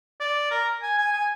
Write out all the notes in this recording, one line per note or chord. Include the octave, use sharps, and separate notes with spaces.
D5
A#4
G#5
G#5
G#5